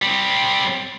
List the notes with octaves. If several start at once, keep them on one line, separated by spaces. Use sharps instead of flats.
G3 C4